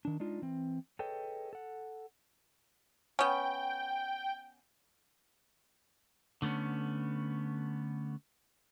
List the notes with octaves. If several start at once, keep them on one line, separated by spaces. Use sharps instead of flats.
D#3 D4
G#3 D4 D#4 F4
E3 C4
G#4 A4 B4 C#5 D#5 G5
A4 F#5
B3 C#4 G5
D3 A3 B3 C#4